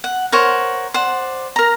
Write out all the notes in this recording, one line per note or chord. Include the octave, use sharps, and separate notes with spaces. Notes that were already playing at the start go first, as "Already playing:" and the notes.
F#5
A#4 C5 C#5 F#5
C5 D5 F#5
A#4 A#5